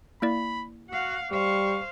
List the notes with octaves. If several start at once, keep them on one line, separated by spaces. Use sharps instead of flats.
A#3 E4 D5 B5
F#4 F5 F#5
G3 C5 F5 C#6